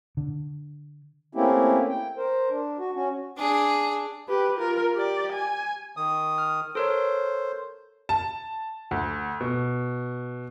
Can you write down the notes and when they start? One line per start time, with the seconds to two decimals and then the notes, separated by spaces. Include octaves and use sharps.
0.17 D3
1.35 A3 A#3 C4 C#4 E4 G4
1.88 G5
2.17 A#4 C5
2.50 D4
2.79 F#4
2.95 C#4 F#4
3.37 D4 G#4
4.28 G4 B4
4.58 F4 A#4
4.94 G4 D5
5.32 G#5
5.97 D#3 D#6
6.38 F6
6.75 A4 A#4 C5 C#5
8.09 A5
8.91 D2
9.40 B2